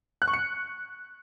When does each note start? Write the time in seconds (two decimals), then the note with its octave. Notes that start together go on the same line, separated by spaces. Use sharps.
0.22 F#6
0.28 C#6
0.33 C#7